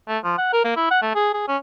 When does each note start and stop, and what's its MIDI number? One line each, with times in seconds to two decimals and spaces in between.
0.08 0.18 57
0.24 0.37 53
0.38 0.49 78
0.53 0.63 70
0.64 0.74 58
0.76 0.87 64
0.91 1.00 78
1.02 1.13 57
1.15 1.32 68
1.34 1.44 68
1.48 1.57 61